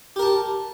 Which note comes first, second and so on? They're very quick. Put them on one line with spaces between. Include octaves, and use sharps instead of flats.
G4 A#4 A5